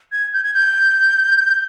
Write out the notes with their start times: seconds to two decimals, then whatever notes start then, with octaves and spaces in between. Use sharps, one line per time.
0.12 G#6
0.34 G6
0.44 G#6
0.54 G6